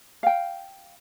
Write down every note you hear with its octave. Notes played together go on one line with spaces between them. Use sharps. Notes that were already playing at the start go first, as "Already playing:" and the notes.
F5 G5